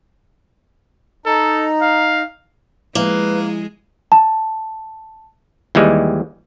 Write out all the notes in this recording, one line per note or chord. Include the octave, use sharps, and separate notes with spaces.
D#4 A4
F5
F3 G#3 A#3 E4 G#4 B4
A5
D#2 E3 G3 G#3